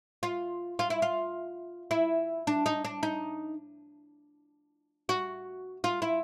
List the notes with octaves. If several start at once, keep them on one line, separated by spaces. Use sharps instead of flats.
F4
F4
E4
F4
E4
D4
D#4
D4
D#4
F#4
F4
E4